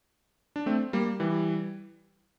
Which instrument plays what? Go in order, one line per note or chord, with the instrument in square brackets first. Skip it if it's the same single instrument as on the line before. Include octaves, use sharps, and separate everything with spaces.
[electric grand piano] D4
A3 C4
G3 A#3
E3 G3